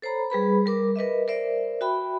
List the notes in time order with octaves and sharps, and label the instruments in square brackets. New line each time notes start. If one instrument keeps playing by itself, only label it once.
[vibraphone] A4 C5 C#5 A#5 B5
G3 G#4 B4 B5
G3 A#4 D6
A#4 B4 D#5 E5
A#4 C5 D5 E5
F#4 E5 G5 B5